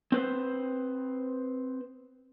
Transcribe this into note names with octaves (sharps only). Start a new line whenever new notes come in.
C4 B4 C5